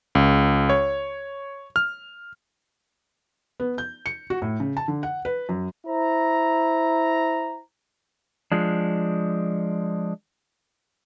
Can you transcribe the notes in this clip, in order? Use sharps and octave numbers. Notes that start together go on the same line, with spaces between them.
C#2
C#5
F6
B3
G6
C#7
F#4
A2
C#3
A5
D3
F#5
B4
F#2
E4 C5 A#5
F3 G#3 D4